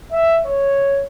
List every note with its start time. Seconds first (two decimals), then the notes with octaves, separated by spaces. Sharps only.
0.12 E5
0.46 C#5